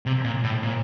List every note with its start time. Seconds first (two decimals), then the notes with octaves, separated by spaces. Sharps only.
0.06 C3
0.24 A#2
0.43 A2
0.63 A#2